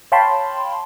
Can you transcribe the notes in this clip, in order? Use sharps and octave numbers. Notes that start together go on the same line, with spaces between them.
C#5 F5 G5 A5 B5 C6